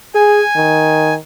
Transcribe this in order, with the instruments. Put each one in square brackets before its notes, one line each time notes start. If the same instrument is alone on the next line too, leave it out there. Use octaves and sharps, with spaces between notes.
[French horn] G#4 [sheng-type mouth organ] G#5
[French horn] D#3